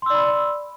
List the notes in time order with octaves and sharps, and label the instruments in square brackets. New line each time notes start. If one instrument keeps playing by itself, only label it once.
[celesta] C6
E6
D5
B5